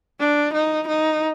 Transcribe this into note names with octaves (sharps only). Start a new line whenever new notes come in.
D4
D#4
D#4